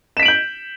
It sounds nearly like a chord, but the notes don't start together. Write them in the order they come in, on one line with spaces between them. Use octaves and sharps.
E7 B6 D7 F#7 G6